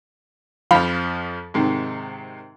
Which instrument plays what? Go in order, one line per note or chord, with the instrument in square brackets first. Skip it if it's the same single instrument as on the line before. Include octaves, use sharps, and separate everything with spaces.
[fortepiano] F2 F3 [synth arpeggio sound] F5 B5
[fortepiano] G#2 C3 D#3